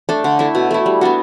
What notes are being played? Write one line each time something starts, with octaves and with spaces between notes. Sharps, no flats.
A3 D4 A4
D3
A3 E4
B2
A3 E4
G3
B3 D4 F#4